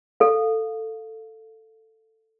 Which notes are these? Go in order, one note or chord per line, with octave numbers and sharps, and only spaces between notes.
A4 F5